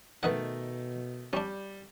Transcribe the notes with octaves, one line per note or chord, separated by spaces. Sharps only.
B2 D#3 A3 B4 D#5 F#5
G3 C#4 D4